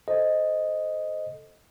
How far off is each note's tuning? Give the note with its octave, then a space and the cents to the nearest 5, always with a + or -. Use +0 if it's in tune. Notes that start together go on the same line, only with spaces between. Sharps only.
A4 +0 C5 +0 D#5 +0